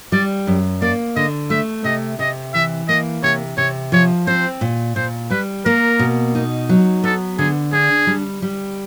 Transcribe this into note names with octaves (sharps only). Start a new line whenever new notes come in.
G3 D5
F#2
A#3 D5
D3 D#5
A3 E5
C3 D#5
C3 D#5
E3 E5
A#3 D#5
C3 C#5
C3 C#5
F3 C#5
C4 C5
A#2
A#2 C5
G3 B4
A#3 A#4
B2
D#4
F#3
B3 A4
D3 G#4
D4 G#4
G3
G3